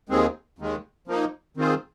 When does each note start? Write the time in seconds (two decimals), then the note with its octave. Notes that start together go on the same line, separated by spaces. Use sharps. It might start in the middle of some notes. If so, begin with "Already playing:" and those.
0.09 D#2 D#3 G#3 C4 G#4
0.59 D#2 D#3 G#3
1.08 F3 A#3 D#4
1.57 D#3 C4 F4 G#4 C5